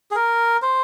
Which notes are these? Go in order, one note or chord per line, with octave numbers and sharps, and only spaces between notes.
G#4
A#4
C5